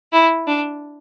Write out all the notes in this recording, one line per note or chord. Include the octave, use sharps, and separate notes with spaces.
E4
D4